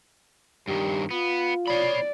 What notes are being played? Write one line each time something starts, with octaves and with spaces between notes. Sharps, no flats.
G2 D#3 G4
B3 F4
C#5 D5 B5